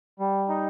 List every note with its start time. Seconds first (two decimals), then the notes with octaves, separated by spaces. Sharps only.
0.20 G3
0.49 D#4